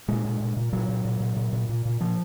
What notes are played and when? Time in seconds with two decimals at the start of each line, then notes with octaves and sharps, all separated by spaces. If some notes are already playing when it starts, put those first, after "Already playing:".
0.08 A#2 G#3
0.25 A#2
0.40 A#2
0.57 A#2
0.73 A#2 F#3
0.89 A#2
1.05 A#2
1.20 A#2
1.37 A#2
1.53 A#2
1.69 A#2
1.85 A#2
2.00 A#2 F3